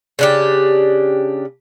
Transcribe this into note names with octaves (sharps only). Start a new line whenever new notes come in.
C#3 D4 G4